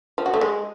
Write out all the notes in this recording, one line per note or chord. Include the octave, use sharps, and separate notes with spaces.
F3
F#4
A3
G#3